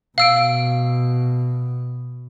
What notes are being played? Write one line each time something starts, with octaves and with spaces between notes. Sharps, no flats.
B2 F5 E6 D7